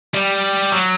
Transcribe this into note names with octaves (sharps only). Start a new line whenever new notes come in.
G3
F#3